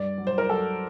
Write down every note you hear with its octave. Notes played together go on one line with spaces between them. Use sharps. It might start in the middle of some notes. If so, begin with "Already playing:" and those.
Already playing: G2 D5
F#3
C5
A#4
F#3 A4